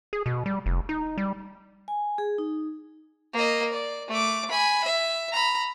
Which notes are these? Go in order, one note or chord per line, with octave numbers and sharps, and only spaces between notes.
G#4
B2
G3
F1
D#4
G3
G#5
G#4
D#4
A#3 D#5
D5
A3 D6
G#5 B5
E5
A#5 B5